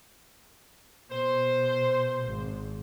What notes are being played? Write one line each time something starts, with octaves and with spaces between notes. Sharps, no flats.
B2 C5
G#1